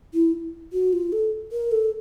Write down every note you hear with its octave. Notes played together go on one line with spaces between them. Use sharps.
E4
F#4
F4
A4
A#4
A4